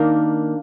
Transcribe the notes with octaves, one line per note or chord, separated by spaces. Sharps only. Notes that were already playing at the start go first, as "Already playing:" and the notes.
Already playing: D#3 A#3 D4